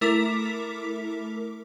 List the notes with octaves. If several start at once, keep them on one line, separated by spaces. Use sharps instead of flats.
A3 E4 A#4 D6 B6